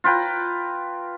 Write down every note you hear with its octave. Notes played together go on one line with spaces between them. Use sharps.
F4 B4 G5 A#5